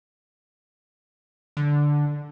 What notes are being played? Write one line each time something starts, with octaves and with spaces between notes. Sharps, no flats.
D3